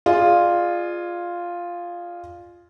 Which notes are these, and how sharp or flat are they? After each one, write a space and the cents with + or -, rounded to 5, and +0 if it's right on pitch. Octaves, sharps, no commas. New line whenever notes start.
F4 +0 G#4 +0 D5 +35